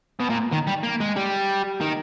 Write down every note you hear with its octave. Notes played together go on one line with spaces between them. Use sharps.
B2
A#2
D#3
G3
A#3
G#3
G3
D#3